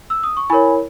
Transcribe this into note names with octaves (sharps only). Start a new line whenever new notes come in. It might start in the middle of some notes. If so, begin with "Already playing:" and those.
E6
D#6
C#6
E4 A#4 C#5 G#5 B5